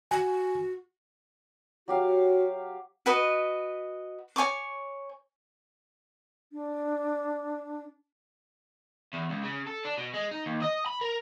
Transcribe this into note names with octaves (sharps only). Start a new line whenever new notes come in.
F#4 G#5
F#3 F#4 G4 F5
F#4 B4 D#5
C#5 G#5 C#6 D6
D4
E2
C#2
C#3
A4
D4
B2
G#3
D#4
D#2
D#5
B5
A#4